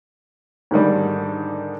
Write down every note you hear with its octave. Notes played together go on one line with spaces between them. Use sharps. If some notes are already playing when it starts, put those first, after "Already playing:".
G#2 D3 D#3 G3